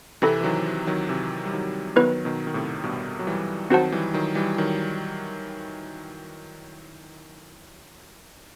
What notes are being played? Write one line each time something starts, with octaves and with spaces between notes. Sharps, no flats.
C3 E3 C4 E4 A4
E3
D#3 F#3
D#3 F#3
C3 E3
G3
D#3 F#3
D#3 F#3 B3 E4 B4
B2 D#3
D#3
A2 C3
G2 B2
F#3
E3 G3
D#3 F#3 C4 F#4 C5 F#5 A5
E3 G3
D#3 F#3
E3 G3
D#3 F#3